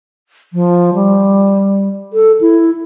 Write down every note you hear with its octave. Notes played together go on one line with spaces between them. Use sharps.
F3
G3
A4
E4